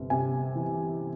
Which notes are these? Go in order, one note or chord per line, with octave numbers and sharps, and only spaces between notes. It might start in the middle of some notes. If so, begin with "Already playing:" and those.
Already playing: G1 C3
C3 G#5
E3